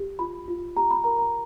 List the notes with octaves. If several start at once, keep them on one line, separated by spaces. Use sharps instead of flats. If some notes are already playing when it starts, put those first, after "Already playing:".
Already playing: G4
F4 B5
F4
G4 A#5
B5
A#4 A#5
A#5